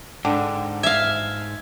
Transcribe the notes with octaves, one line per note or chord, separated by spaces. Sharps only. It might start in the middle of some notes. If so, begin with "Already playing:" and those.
G#2 D3 G5 D6
E5 F5 G#6